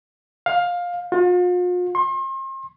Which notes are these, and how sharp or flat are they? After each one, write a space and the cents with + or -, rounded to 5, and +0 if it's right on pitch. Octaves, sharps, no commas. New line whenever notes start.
F5 +15
F4 +45
C6 +40